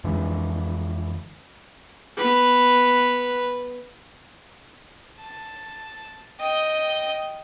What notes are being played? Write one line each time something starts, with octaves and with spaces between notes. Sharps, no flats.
F2 D3 E3 G#3
B3 B4
A5
D#5 G5